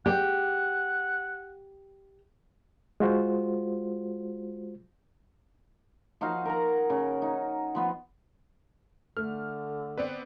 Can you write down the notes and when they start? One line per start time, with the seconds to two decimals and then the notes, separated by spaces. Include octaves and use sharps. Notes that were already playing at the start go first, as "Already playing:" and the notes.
0.06 G4 F#5
3.00 G#3 F4 F#4 C5
6.21 F3 D#4 F#4 F5
6.45 A#4 F#5 A#5
6.90 C#3
7.22 D#4
7.75 F3 B3 F4
9.17 D3 A3 F6
9.98 B3 C4 B4 D5